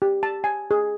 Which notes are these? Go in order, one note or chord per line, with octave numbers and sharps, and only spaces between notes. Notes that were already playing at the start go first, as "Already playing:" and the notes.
G4
A5
G#5
G#4